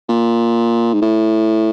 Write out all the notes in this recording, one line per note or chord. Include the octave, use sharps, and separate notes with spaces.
A#2
G#2
A2